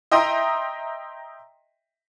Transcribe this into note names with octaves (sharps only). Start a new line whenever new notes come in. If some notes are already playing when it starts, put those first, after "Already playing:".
D#5 E5 G5 A#5 C6 D#6